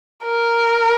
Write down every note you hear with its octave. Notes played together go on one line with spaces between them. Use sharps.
A#4